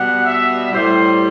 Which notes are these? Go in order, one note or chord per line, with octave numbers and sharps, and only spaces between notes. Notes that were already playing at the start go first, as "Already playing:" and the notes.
Already playing: B2 G3 F#5
E5
A2 G3 C5